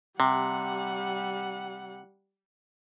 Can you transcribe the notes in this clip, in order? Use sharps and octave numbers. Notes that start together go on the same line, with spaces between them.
C3 G3 F#5